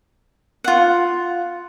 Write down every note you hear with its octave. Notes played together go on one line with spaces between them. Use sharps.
F4 F#5